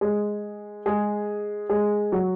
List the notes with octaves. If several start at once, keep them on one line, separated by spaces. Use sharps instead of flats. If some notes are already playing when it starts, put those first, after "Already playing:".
G#3 G#4
G#3 G#4
G#3 G#4
F#3 F#4